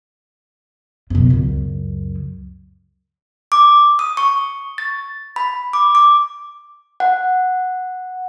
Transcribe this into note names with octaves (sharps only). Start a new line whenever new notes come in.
F#2 B2
C#2 F#2
D6
D#6
C#6
A6
B5
D6
D6
F#5